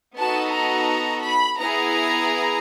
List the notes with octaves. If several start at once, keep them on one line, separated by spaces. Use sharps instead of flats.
B3 D#4 F#4 A4 A5
A#5
B5
B3 E4 G#4 A#5